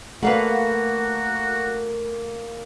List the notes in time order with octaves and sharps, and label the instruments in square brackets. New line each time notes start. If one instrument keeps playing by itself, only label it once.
[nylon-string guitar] A3 [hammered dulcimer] A#3 A4 A#5 [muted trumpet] F#4 [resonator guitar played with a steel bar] B4 F5 F#5